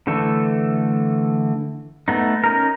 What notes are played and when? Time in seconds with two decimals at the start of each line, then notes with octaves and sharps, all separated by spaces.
0.07 D3 E3 A3 A4
2.08 A3 B3 D#4
2.44 C#4 D#4 A#4